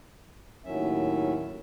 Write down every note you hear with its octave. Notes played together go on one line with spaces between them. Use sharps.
D#2 A2 D#3 F#3 C#4 E5